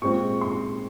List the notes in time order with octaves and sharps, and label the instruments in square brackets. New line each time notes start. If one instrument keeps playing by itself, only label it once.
[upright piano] A#2 G#3 C4 C#6
C6